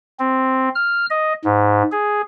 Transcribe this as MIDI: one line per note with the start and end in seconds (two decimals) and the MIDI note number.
0.20 0.69 60
0.75 1.06 89
1.10 1.33 75
1.45 1.83 44
1.92 2.22 68